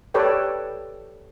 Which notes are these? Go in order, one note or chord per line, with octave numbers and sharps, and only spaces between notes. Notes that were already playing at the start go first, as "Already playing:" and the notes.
G4 A4 B4 C#5 D5 G5